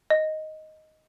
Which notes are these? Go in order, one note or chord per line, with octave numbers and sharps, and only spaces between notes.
D#5